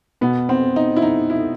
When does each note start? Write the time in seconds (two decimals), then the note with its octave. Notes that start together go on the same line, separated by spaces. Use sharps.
0.21 B2 B3
0.49 C4
0.76 D#4
0.96 E4
1.02 D#4
1.30 E4